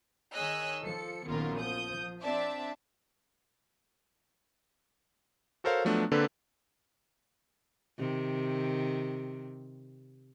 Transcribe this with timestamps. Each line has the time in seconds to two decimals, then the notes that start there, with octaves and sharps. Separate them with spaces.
0.32 D#3 G#4 C#5 D#5 E6 F#6
0.83 F3 A4 C#7
1.28 A#1 F#2 D#3 B3 F4 A#4
1.59 F3 D#6 G6
2.21 C4 D4 D5 E5 A5
5.64 F#4 A4 A#4 C5 C#5 F5
5.85 F3 F#3 A3 B3 D4
6.12 D3 A#3 C4 D4 A4 B4
7.98 C3 D#3